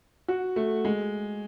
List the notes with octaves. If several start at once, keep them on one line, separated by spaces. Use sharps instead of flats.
F#4
A3
G#3